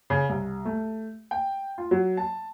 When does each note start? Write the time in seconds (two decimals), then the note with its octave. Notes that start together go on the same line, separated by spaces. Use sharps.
0.10 C#3
0.29 C2
0.65 A3
1.31 G5
1.78 F4
1.91 F#3
2.17 A5